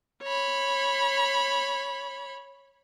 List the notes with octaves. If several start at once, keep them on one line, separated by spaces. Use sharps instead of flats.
C#5 B5